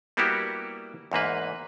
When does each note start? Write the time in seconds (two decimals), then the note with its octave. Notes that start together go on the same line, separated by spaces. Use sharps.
0.17 G3 A#3 B3 E4 F#4 G4
1.12 E2 G#2 A#3 B4